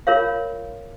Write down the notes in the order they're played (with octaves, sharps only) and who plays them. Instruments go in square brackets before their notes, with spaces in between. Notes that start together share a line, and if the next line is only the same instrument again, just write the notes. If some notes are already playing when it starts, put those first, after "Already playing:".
[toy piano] F4 A#4 C#5 F5